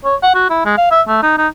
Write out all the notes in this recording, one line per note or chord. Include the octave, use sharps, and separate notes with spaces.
C#5
F#5
F#4
E4
G#3
F5
E5
A3
D#4
D#4